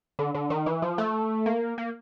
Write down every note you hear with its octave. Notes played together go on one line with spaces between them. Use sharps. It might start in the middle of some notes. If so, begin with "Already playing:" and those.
D3
D3
D#3
E3
F3
A3
A#3
A#3